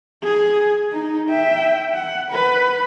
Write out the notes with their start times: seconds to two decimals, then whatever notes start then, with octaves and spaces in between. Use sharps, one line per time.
0.23 G#4
0.92 D#4
1.29 E5 G5
1.93 F#5
2.31 B4